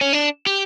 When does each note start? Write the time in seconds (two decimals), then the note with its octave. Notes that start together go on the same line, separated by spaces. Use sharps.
0.01 C#4
0.13 D4
0.46 G4